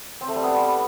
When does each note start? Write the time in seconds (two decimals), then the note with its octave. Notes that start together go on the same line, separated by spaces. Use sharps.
0.21 C4
0.28 A3
0.36 G3
0.43 B3